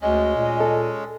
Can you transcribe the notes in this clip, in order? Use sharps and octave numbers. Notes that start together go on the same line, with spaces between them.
D2 G#3 C#4 D#5
A#2
A4